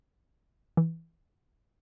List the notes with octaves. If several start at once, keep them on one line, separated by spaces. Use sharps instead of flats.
E3